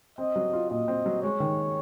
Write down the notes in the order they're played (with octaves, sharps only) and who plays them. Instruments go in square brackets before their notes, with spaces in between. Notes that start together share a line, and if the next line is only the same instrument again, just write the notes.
[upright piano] C4 [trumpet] D#5
[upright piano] F#3
F4
[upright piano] A#2 [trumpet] D#5
[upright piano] C4
F#3
[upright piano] G#3 [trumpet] C#5
[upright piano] D#3